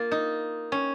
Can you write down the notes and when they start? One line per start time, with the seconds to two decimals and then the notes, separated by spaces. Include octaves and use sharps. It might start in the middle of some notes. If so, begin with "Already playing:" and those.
Already playing: A#3 F4
0.11 D#4
0.72 C#4